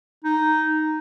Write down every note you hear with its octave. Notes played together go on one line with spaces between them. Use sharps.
D#4